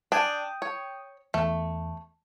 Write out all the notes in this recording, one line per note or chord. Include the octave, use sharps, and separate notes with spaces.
D4 G5 G#5 D#6
C#5
E2 A3